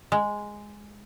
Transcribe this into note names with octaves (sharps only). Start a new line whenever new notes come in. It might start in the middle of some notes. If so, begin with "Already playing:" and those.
G#3